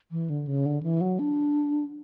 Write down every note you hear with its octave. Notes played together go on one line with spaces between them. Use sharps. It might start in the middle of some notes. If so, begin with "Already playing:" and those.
E3
D3
C#3
D3
E3
F#3
D4